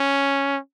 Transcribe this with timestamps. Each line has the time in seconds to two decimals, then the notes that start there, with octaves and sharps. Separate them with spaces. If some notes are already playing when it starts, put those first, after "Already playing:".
Already playing: C#4